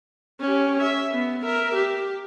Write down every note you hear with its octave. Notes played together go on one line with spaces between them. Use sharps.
C#4 G4
E5
B3
A#4 E5
G4